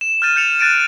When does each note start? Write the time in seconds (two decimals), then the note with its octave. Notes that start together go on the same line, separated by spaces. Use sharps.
0.01 E7
0.22 F6 G6 A6 D#7
0.36 G6 A6 C#7 E7 F7
0.59 F#6 A6 D7 D#7